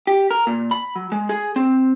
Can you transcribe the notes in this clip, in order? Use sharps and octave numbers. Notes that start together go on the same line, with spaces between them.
G4
A#4
A#2
B5
F#3
G#3
G#4
C4